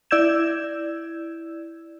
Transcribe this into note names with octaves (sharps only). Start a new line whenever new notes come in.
E4 D5 E6 G6 G#6 E7